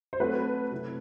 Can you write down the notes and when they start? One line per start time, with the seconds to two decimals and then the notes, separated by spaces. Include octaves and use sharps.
0.13 C5
0.20 F#3 A3 C4 F#4 A4 B4
0.72 C3 F#3 A3 E4